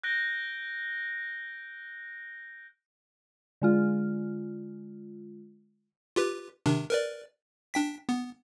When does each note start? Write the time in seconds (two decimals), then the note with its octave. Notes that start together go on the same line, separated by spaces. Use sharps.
0.03 F#6 G6 A#6 D7 G7
3.62 D3 G#3 F4
6.16 F4 G4 B4
6.66 C3 D#3 D4
6.90 A#4 B4 D5
7.74 D4 G5 B6
8.09 B3